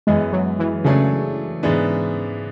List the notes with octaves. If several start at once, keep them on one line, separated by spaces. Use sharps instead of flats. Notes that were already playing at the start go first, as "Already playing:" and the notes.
F#2 E3 G#3 B3
F#3
E3
C#3 F#3 A3 D4 G#4
G#2 E3 G#3 B3 D4